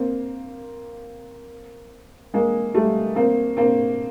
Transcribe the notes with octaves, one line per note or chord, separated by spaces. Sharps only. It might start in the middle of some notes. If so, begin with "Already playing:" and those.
Already playing: A#3 C4
G#3 A#3
G3 A3
A#3 C4
A#3 C4